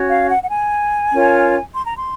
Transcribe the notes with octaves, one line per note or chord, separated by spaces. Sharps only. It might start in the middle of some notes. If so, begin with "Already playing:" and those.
Already playing: C#4 F#4 C#5
F5
F#5
F#5
G#5
C#4 F4 A#4 C#5
C6
A#5
C6